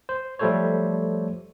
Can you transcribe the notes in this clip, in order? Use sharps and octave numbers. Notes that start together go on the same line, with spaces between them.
C5
F3 G3 A3 A4 C5 C#5